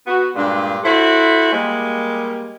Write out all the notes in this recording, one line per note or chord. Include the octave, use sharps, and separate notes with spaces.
B3 F#4
G2 A#2 G#3 D4
E4 F#4 A4 C5
G3 G#3 A#3